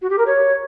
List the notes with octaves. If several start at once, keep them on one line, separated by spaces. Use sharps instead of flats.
F#4
G4
A#4
C#5